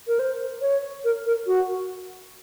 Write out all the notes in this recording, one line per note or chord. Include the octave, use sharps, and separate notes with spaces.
A#4
C5
C#5
A#4
A#4
F#4